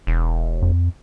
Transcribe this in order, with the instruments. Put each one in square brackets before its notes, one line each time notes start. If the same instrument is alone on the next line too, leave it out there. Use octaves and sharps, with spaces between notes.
[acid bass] E1
[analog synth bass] F2